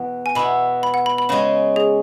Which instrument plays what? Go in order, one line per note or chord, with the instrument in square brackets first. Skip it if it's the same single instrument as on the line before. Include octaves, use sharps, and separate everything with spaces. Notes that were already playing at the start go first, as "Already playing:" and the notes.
Already playing: [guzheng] E2 B2 B3
[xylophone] G#5
[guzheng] B2 B3 E4 [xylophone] B5
[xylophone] B5
F#5
B5
B5
[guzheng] C#3 G#3 C#4 [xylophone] B5
[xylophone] G#4